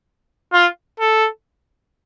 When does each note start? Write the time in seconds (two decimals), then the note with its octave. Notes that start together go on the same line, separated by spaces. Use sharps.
0.53 F4
1.00 A4